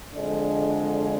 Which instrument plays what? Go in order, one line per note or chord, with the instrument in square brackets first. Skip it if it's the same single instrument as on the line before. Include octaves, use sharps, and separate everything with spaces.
[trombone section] F2 D3 G#3 D4